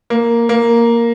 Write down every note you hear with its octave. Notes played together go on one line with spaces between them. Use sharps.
A#3
A#3